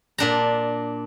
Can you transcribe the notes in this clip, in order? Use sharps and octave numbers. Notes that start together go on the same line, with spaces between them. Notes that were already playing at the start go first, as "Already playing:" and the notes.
A#2 D4 A#5